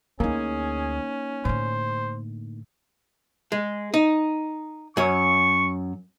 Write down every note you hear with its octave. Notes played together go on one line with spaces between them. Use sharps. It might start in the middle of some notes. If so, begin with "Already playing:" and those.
D2 A#3 C#4 D#4 E4 G#4
A2 D3 C5
G#3
D#4
F#2 C#5 C#6